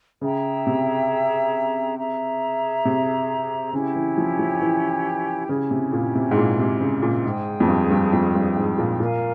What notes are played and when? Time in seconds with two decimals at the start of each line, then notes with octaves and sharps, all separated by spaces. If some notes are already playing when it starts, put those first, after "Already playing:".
0.21 C#3 G#4 E5 G5 A#5
0.67 C3
1.97 G#4 E5 A#5
2.85 C3
3.73 C#3 C#4 E4 G4
3.96 E3
4.18 F3
4.39 F3
4.62 E3
5.49 C#3 C#4 E4 G4
5.71 C3
5.93 A#2
6.15 C3
6.31 G#2
6.38 A#2
6.59 C3
6.81 C#3
7.02 A#2
7.24 G#2 G#4 C5 G5
7.60 F2
7.69 G2
7.91 G2
8.13 F2
8.35 G2
8.56 G#2
8.78 A#2
9.00 A#2 A#4 F5 G#5